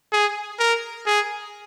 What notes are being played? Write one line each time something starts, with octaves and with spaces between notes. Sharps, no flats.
G#4
A#4
G#4